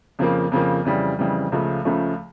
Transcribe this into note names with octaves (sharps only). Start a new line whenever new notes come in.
F2 C#3 F3 A#3
F2 C#3 F3 A#3
F2 C#3 E3 G3
F2 C#3 E3 G3
C#2 C#3 F3 A3
C#2 C#3 F3 A3